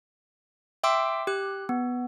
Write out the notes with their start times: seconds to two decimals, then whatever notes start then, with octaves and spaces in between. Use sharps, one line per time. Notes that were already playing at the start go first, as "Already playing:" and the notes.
0.84 E5 G5 C6 D6 E6
1.27 G4 F#6
1.69 B3